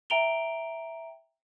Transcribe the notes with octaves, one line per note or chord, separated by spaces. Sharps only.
E5 G5 A#5 D7 F7 G7